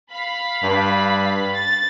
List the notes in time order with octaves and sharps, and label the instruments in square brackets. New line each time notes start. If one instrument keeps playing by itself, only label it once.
[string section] F5 B5
[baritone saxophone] G2
[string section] A6